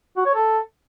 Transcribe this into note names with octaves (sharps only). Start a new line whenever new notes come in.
F#4
C#5
A4